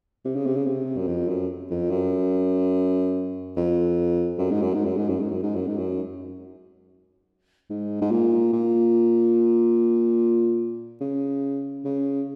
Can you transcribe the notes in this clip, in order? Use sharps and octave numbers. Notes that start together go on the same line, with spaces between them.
C3
C#3
C3
C#3
C3
F#2
F2
F#2
F2
F#2
F2
F#2
G#2
F#2
G#2
F#2
G#2
F#2
G#2
F#2
G#2
F#2
G#2
F#2
G#2
G#2
A#2
A#2
C#3
C#3